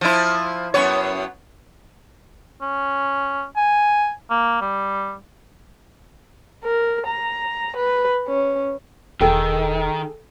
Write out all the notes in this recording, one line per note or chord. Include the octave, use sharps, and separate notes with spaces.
F3 E4
F#2 B3 C#5
C#4
G#5
A#3
G3
A#4
A#5
B4
C#4
E1 D#3 G#4 A4 G5